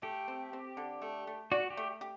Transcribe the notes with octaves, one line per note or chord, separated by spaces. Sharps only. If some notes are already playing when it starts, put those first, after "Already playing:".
A3 G4
C4
C4
D3
A3
A3
F#4 D5
G4
A3
G4